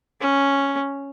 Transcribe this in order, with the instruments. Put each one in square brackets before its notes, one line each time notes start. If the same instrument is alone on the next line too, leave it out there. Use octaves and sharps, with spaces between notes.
[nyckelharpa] C#4